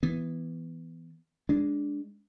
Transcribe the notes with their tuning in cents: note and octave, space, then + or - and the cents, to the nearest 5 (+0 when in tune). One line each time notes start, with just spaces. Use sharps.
E3 +0 B3 +5
G#3 +0 D4 -10